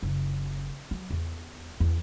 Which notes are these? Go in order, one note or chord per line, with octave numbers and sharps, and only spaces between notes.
F#1
F#3
E2
E2